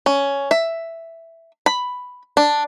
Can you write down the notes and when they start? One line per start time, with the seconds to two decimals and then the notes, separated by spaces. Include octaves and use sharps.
0.06 C#4
0.51 E5
1.66 B5
2.37 D4